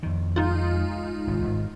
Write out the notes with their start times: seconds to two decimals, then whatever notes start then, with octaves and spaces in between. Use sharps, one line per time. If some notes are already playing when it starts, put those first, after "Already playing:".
0.03 F2 D#3
0.36 G#3 D#4 F4
1.27 G#1 C3
1.42 G#1